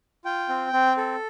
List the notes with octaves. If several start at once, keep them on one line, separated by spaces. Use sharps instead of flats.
F4 G5
C4
C4
A4